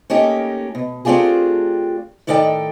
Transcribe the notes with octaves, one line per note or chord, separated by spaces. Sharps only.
A3 A#3 C#4 D#4 G4
B2
A3 C4 D4 F4 G4 G#4
A2 D#3 D#4 A4 D5 G5